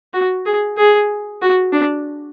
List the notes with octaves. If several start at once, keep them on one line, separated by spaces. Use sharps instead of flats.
F#4
G#4
G#4
F#4
D4